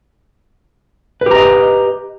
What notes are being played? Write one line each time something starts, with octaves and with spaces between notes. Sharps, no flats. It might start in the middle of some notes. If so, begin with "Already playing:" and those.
G4 B4 D#5 A#5